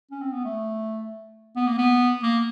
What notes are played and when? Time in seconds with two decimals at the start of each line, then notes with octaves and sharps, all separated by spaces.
0.11 C#4
0.22 C4
0.33 B3
0.44 A3
1.56 B3
1.67 A#3
1.78 B3
2.23 A#3